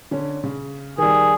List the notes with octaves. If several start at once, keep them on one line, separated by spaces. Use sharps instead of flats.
D3 C#4
C#3
D#3 G3 G#4